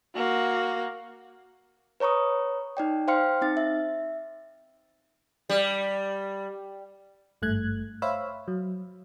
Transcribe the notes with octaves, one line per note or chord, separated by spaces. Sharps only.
A#3 F#4
B4 C#5 A#5 C#6 D#6
D#4 D5 G5
C5 F5 G5 C6 F6 C#7
C4 D#4 A6
E5
G3
G#1 G2 A3 F#6 G#6
C5 C#5 E5 F5 B5 E6
F#3